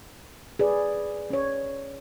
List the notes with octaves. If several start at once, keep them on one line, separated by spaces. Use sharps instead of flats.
G#4 B4 D5
C#4 C#5